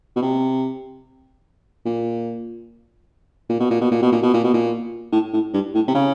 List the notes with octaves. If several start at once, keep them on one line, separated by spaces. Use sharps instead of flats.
B2
C3
A#2
A#2
B2
A#2
B2
A#2
B2
A#2
B2
A#2
B2
A#2
A2
A2
G2
A2
C3
C#3